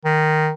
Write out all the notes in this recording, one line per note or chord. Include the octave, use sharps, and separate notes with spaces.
D#3